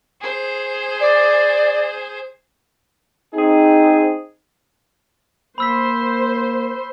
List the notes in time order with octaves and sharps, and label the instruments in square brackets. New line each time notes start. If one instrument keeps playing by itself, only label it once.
[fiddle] G#4 C5
[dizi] D5
[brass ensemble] C4 D#4 [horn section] G#4
[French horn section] A#3 [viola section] C5 [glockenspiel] B5 E6 B6